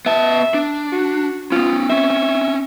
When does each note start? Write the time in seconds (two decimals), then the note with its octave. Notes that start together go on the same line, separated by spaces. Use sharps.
0.06 B3 E5 A5
0.54 D4
0.92 F#4
1.52 B3 C#4 F4
1.90 C4 C#4 E5